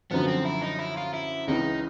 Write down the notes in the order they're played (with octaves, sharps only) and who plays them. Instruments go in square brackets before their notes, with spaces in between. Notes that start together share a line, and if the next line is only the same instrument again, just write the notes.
[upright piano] F#2 D3 F3 [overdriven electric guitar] B3
[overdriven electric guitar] C4
E4
D#4
E4
F4
E4
[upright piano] C#2 C#3 E3 [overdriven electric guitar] D#4